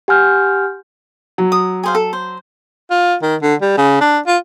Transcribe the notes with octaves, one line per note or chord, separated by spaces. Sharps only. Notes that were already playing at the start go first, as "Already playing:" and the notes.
G4 F#5 G#5 C6 F6 G6
F#3
D#6
G#4 C5 F5
A4
C5
F4
D#3
D3
G3
C#3
D4
F4